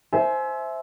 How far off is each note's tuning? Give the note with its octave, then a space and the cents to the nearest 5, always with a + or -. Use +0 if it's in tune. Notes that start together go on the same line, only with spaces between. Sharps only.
C5 +0 E5 +0 G#5 +35